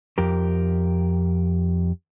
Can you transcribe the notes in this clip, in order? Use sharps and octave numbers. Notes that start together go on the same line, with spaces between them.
F2 G4 A#4